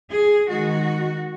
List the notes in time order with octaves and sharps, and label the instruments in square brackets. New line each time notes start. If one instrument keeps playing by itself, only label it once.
[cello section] G#4
D#3 G#3 D#4 F#4